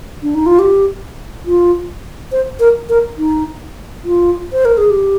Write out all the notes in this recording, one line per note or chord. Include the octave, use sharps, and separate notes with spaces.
D4
D#4
F4
G4
F4
C5
A#4
A#4
D#4
F4
C5
A#4
G#4
G4